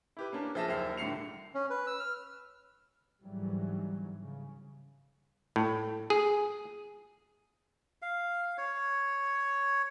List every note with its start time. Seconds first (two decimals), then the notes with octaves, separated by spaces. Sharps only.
0.17 E4 G4 B4
0.32 A#3 C#4 D4
0.55 F3 G#4 E5 A5 A#6 E7
0.68 F#1 D#2 C5 E5 F6 C7
0.97 D#1 A2 D3 C7 C#7 F7
1.54 C#4
1.70 B4
1.87 E6
2.00 F6
3.22 G1 G#2 E3 F#3 G3
4.21 C#3
5.56 A2
6.10 G#4
8.02 F5
8.58 C#5